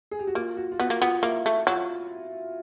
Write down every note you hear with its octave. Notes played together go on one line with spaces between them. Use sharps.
G#4
G4
F#4
A#3 F4
F#4
F4
B3 F#4
A#3
B3 F4
A#3 E4
A3
F#3 F4